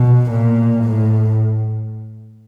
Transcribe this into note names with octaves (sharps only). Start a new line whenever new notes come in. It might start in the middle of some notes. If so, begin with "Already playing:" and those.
Already playing: B2
A#2
A2